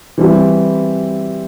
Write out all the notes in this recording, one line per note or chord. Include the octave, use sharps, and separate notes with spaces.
E3 G3 C4 E4